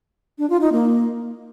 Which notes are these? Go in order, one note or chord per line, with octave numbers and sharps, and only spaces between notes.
D4
F4
D#4
A#3